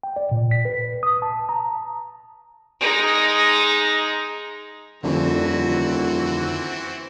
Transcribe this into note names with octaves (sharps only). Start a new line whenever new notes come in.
G5
D5
A#2
B6
B4
D#6
A5
A#5
G#3 D#4
D#1 F2 D3 E3 C4 F#4